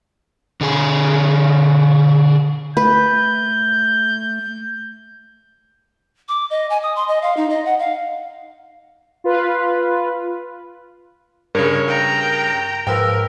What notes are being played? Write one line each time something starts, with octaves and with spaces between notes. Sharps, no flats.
D3 G#4
A3 B4 G6
D6
D#5
G#5
D#6
C6
D#5
F5
D#4
D#5
F#5
F5
F4 B4
G2 C#3 A#4 C#5
G5 A#5
G#2 F3 A#4 B4 G5 E6